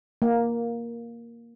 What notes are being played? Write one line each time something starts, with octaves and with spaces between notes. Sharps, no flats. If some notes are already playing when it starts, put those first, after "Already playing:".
A#3